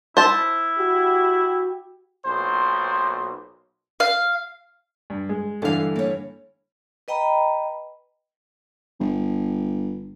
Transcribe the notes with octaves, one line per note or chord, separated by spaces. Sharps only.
E4 C5 A5
F#4 G4
B1 A#2 C5
F5
G2
G#3
G2 D3 E3 A4 F5
A#3 C#5
B4 D#5 G5 A#5 B5
G1